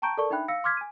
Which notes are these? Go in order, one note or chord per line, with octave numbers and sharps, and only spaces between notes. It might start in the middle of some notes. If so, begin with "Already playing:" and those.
G5 A5 A#5 C#6 G6 D7
A4 A#4 D5 A5 C#6
D4 D#4 E5 G5 B5 F#6
F5 E6 A#6 C#7
C6 D6 F6 G#6 B6
G#5 D#7